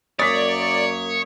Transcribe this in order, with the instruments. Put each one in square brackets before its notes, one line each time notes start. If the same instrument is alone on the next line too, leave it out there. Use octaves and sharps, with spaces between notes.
[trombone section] F#2 A#3 [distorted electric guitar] C#5 [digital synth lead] D5 [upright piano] D#6 B6